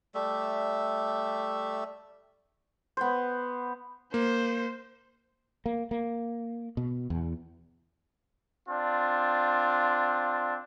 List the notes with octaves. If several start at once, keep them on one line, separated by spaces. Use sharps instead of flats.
G3 A3 E5
B3 C5
A#3 C5
A#3
A#3
B2
E2
C4 D4 F4